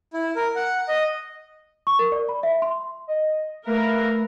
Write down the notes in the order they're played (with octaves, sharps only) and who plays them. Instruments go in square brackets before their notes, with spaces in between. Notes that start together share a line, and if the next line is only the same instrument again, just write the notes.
[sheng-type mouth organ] E4
A#4
F#5
D#5
[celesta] C#6
A#4
D5
B5
E5
C6
[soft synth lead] D#5
[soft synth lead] A3 [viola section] A#4 [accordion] B4 E5 F5